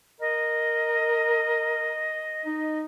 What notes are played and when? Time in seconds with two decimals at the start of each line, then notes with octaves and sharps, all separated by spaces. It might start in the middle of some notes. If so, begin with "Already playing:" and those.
0.20 A#4 D#5
2.46 D#4